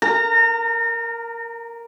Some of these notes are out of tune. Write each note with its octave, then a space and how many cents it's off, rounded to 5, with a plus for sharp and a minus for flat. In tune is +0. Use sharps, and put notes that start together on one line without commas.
A#4 +0 A#5 -35